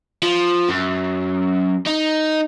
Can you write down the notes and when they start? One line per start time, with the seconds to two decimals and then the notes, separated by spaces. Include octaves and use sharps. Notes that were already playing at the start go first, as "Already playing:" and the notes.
0.23 F3
0.69 F#2
1.87 D#4